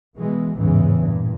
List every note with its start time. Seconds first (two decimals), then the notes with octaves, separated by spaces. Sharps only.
0.17 B2 E3 G#3
0.55 A1 E2 G#2 C#3 E3
1.00 G2 A#2